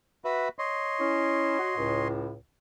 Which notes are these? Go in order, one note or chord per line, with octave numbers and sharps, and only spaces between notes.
F#4 B4 E5
C#5 D#5 C6
C#4 E4
F#4
C#2 A2